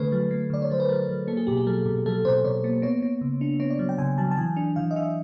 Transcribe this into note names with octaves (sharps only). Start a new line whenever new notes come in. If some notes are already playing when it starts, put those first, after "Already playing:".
Already playing: D3 A3 A4 B4
F#3
A3
D3 D5
C#5
F#3 C5
B4
F#3 A#4
F#3
A#3 A4
G#4
B2 G4
G#4
F#3 A4
B2
F#3 A4
B2 C5
B2 C#5
A#3
B3 C#5
B3
C#3
D4
B3 C#5
D5
F#3
G5
C#3 G#5
F#3 A5
A5
E3 G#5
D4
E3 F5
D#5
D4 E5